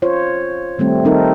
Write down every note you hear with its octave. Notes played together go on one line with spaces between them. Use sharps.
F4 C5 C#5
D#3 G3 A3 C4
D#3 G3 C4 D#4 A4 A#4